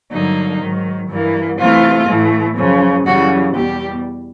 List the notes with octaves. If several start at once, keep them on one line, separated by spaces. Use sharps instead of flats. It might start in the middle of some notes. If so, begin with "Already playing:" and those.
G2 D3 F#3 A#3 D#4
G#2 D#3 F#3
G2 E3 G3 A#3
C3 E3 A3 F4
A2 E3 A3
F#2 C#3 F3
F#2 C#3 E3 G3 F#4
E2 B2 G3 G4